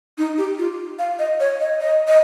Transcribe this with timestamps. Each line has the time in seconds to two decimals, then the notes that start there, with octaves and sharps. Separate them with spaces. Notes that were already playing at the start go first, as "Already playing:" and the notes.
0.18 D#4
0.38 G4
0.58 F4
0.99 F5
1.19 D#5
1.40 C#5
1.60 D#5
1.80 D#5
2.07 D#5